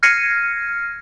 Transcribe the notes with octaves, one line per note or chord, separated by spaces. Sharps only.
F6 G#6 A#6 C7 C#7 D#7